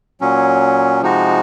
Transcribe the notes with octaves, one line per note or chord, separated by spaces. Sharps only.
A#2 F#3 C#4
C3 F3 G#3 D#4 F#4